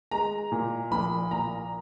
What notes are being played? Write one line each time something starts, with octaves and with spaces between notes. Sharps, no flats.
G#3 A#5
A#2
A#1 B5
A#2 A#5